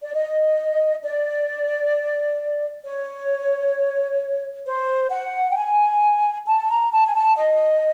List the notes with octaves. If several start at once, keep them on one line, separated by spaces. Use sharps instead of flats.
D5
D#5
D5
C#5
C5
F#5
G5
G#5
A5
A#5
A5
G#5
A5
D#5